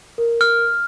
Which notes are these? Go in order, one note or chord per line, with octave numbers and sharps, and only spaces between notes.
A#4
F6